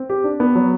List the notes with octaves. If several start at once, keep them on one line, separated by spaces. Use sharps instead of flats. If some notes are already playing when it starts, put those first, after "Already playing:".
Already playing: C4
G4
D4
B3
F#3